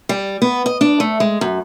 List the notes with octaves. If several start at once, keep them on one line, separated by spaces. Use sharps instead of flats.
G3
B3
D#5
D4
A3
G#3
F#2